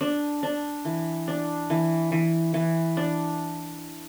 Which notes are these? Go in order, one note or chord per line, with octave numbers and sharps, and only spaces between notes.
D4
D4
E3
D4
E3
E3
E3
D4